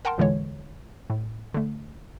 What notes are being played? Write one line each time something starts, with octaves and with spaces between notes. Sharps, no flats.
A#4 F#5 G5 A5 C6
E2 A#2 D3 E3 G#3 C#5
A2
D3 A3